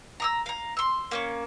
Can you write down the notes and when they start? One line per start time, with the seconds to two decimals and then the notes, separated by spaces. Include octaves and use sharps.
0.20 A#5 D#6 E6
0.46 F5 A#5
0.77 C6 E6
1.11 A#3 C#4 C#6